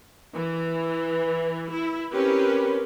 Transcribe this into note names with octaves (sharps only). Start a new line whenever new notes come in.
E3
E4
C4 C#4 G4 A#4 B4